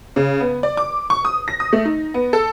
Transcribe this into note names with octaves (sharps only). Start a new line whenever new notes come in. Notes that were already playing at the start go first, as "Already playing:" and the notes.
C#3
B3
D5
D6
C#6
D#6
A#6
D#6
A3
D#4
B3
A4